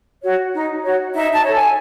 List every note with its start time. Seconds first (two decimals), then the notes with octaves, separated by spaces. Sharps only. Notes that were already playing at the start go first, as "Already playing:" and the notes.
0.24 F#4 C#5
0.54 D#4
0.84 F#4 C#5
1.14 D#4 E5
1.33 A5
1.44 A4 C#5
1.54 G#5